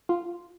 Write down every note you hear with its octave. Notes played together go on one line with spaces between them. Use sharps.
F4